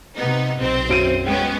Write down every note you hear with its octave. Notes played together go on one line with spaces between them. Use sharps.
C3 B3 D#4
B1 C4 C5
F#2 D7 D#7
G#3 B3 C#4 G5